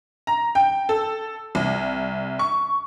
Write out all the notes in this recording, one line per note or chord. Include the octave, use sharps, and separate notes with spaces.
A#5
G5
A4
C2
C#6